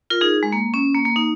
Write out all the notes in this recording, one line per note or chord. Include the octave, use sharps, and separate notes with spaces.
F4 A#4
D#4 G#4
G#3
A#3
C#4
A#3
A#3
D#4